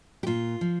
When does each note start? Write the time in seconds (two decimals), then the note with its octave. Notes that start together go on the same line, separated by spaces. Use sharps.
0.23 G4
0.27 A#2 F4
0.61 F3